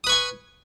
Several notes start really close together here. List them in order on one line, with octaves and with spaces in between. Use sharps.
D#6 B4 C#6 G#5